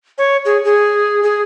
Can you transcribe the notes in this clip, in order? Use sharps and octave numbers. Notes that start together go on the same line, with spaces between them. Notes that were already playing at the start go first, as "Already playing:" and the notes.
C#5
G#4
G#4
G#4